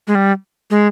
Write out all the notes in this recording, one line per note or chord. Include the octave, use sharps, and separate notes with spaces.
G#3
G3
G#3